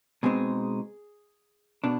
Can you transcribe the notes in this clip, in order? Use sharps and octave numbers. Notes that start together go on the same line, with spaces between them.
B2 G#3 C4 D#4 G#4
B2 D4